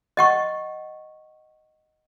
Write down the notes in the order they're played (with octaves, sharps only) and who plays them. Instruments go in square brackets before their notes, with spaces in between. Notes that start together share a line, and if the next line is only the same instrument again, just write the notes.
[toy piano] D#5 F#5 C#6